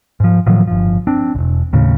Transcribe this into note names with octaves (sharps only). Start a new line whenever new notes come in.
G#2 F3
A2 D#3 F3 F#3
G1 F3
C4 D4
E1 A#1
D#2 A2 C#3